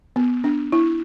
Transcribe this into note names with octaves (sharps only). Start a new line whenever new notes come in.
B3
D4
E4